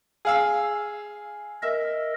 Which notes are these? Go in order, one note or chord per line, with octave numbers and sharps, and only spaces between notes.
G#4 F5 E6
A#4 D#5 E5